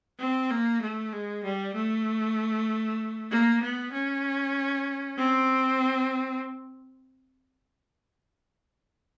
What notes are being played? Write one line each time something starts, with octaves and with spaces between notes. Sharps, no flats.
C4
A#3
A3
G#3
G3
A3
A#3
B3
C#4
C4